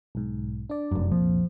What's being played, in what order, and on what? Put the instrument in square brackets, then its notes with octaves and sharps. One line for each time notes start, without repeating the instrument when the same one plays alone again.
[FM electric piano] B1 G#2
D4 D5
[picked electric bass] F1 F#2
[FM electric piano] C2 F2 A#2 [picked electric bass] F3